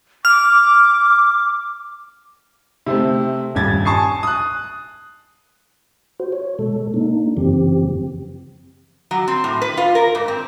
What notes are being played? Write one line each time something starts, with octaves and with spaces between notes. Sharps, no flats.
D6 F6
C3 A3 C4
D#1 G2 G#6 A6
G#5 A5 C#6 D#6 C7
D#6 F#6
F#4 C5
C#5
B2 G#3 A4
A#3 D4 D#4
F#2 C#3 E3 F3 C4 G4
F#3
C4
A2
B4
F4
A#4
G#2
C4